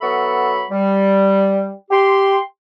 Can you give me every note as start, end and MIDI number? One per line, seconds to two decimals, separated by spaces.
0.02 0.64 54
0.02 0.64 59
0.02 0.64 69
0.02 0.64 76
0.02 0.64 83
0.02 0.64 85
0.70 1.72 55
1.91 2.37 67
1.91 2.37 84